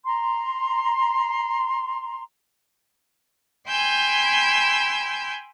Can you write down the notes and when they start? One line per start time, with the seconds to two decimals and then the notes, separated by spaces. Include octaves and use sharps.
0.05 A#5 C6
3.68 G5 G#5 B5 C6 E6 G6